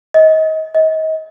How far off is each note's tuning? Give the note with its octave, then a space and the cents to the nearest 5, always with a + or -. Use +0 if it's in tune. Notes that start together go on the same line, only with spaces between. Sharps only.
D#5 +25
D#5 +30